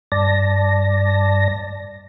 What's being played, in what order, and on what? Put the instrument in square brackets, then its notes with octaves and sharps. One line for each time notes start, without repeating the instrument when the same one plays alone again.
[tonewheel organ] G2 D5 A5 A#6